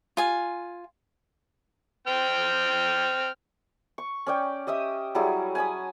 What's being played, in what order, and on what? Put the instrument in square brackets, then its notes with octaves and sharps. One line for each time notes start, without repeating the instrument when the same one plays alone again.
[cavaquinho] F4 G#5
[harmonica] C4 G5 F6
[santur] C#6
C#4 D5 G5
G4 D#5 E5 D#6
F#3 G3 E4 G#4
G#5 A5 B5 D#6